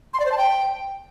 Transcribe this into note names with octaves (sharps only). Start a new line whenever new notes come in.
C6
D5
C5
A5
G5